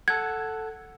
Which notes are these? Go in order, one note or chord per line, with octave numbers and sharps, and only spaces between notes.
A4 F#5 G#6